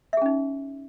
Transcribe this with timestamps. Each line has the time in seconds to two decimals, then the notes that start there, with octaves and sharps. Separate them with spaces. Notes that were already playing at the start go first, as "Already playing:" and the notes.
0.13 E5
0.17 G#4
0.22 C#4
0.26 D#4